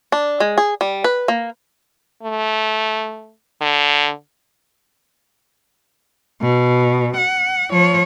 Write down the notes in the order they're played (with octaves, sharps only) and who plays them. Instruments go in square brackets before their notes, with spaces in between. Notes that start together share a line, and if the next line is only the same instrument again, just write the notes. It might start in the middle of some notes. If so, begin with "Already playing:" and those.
[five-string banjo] D4
G#3
G#4
G3
B4
A#3
[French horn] A3
D3
[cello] B2
F#5
F3 C#5